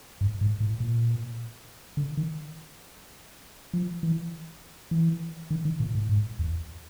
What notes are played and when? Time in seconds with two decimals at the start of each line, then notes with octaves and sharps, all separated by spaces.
0.21 G2
0.41 G#2
0.60 A2
0.80 A#2
1.97 D3
2.17 D#3
3.73 F3
4.03 E3
4.91 E3
5.51 D#3
5.65 D#3
5.80 A#2
5.95 A2
6.09 G#2
6.39 E2